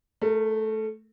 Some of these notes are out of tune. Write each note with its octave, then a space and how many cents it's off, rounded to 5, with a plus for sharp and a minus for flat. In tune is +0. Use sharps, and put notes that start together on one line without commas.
A3 -10 A#4 -35